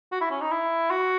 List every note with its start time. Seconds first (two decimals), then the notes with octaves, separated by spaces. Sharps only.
0.12 F#4
0.21 E4
0.31 C#4
0.41 D#4
0.51 E4
0.90 F#4